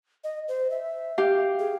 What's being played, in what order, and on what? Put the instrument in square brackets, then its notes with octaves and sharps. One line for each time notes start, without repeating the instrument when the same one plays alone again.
[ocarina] D#5
C5
E5
[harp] G4 F5
[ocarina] G#4